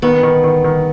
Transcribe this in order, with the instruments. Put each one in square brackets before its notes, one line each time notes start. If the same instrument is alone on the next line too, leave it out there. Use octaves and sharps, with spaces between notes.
[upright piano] D#3 [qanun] B3
[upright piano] D#3
D#3
D#3